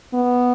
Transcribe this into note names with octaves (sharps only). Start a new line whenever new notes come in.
B3